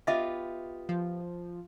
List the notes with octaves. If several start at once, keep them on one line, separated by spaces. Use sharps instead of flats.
B3 F4 G4 D#5 E5 D6
F3